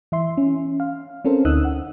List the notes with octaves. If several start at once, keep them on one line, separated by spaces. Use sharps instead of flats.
E3 E5 C6
C#4
F5
C4 C#4 A4 A#4 C5
D2 D#4 D#6 E6 F#6
F#5